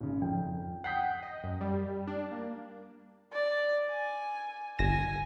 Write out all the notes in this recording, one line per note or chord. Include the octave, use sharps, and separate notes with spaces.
G#1 C#3
F2 G5
F#5 G5 D#6 G6 B6 C7
D#5
F#2
G3
D4
A#3
D5
G#5
G1 G#5 A#6 E7